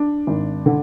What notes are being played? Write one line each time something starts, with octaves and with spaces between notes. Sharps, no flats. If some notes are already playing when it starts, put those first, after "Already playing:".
Already playing: D4
G#1
D3